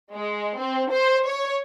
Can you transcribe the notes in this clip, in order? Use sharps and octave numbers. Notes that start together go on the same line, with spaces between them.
G#3
C4
C5
C#5